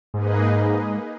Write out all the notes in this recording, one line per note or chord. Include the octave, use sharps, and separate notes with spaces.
G#2 A#3 D#4 G#4 B4 D#5